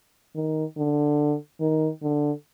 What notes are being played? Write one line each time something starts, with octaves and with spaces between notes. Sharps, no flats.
D#3
D3
D#3
D3